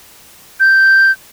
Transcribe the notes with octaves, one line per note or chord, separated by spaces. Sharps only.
G6